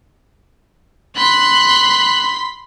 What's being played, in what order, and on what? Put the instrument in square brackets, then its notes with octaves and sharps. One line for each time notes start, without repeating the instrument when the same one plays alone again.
[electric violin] B5 C6 [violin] F#6